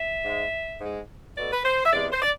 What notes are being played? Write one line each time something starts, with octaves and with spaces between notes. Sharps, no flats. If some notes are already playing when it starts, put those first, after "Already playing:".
Already playing: E5
G#2 G#3
G#2 G#3
B2 A3 D5
B4
C5
E5
E2 C3 G#3 D5
C5
D5